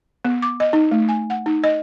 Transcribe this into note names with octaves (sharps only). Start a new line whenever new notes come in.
B3
D6
D#5
D#4
A3
G#5
F#5
D#4
D#5